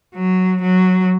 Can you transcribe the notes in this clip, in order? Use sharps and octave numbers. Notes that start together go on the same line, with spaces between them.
F#3
F#3